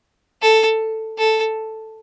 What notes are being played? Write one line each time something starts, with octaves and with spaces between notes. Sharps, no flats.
A4
A4